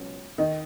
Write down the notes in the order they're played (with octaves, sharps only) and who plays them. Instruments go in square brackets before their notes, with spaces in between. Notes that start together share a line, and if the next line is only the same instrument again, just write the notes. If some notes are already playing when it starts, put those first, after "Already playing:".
Already playing: [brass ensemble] C#2 B2 F#3 C#4
[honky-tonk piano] D#3 D#4